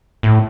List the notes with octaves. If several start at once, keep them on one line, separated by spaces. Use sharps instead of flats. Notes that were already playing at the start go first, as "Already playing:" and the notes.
A2